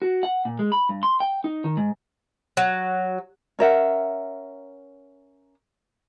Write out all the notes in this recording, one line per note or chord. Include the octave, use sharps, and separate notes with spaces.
F#4
F#5
A#2
G#3
B5
G2
C6
G5
D#4
D#3
G#2
F#3
C#4 A#4 E5 F#5